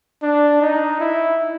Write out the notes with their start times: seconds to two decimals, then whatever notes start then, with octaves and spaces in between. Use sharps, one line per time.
0.23 D4
0.61 D#4
1.00 E4